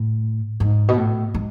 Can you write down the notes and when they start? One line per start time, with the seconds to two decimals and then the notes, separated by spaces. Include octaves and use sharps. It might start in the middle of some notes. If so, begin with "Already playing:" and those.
Already playing: A2
0.60 G#2
0.88 B2
0.97 A2
1.34 G#3